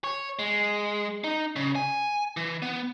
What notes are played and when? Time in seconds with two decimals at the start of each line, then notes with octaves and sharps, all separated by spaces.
0.04 C#5
0.39 G#3
1.24 D#4
1.56 C#3
1.75 G#5
2.37 E3
2.62 B3